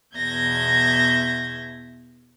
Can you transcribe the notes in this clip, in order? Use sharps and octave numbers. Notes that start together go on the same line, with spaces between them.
E2 B2 E5 G6 G#6 A#6